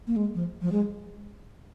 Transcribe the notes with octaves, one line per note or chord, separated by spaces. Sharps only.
A#3
G#3
F3
F3
G#3